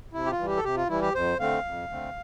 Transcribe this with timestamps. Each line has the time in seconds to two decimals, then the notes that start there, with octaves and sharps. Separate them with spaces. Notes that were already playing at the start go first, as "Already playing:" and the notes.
0.13 C3 E4
0.26 G4
0.31 F4
0.39 E3 G3
0.47 G4
0.57 A4
0.64 C3 G4
0.77 F4
0.89 E3 G3 E4
1.02 G4
1.15 F2 C5
1.39 D3 A3 C4 F5
1.65 F2
1.90 D3 A3 C4